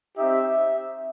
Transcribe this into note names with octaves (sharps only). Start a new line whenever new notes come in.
C4 D#4 G4 E5